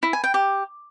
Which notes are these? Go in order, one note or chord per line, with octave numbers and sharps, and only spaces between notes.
E4
G#5
G5
G4